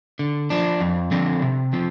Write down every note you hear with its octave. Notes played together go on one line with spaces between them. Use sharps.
D3
F3 D4
F2
D3 F3 C4
C3
F3 C4